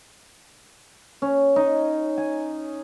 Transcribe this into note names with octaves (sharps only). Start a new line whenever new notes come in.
C#4
D#4
G#5